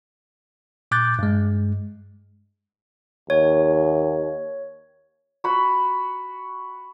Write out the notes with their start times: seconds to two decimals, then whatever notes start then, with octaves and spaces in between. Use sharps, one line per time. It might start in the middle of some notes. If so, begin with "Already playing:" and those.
0.91 A#2 D6 F#6 G6 A6
1.19 G2 G#3
3.30 D#2 C#5
5.44 F#4 B5